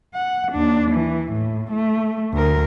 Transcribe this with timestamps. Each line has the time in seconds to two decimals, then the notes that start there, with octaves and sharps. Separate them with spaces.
0.15 F#5
0.52 D#2 D4
0.91 E3
1.31 A2
1.72 A3
2.34 D2 A#4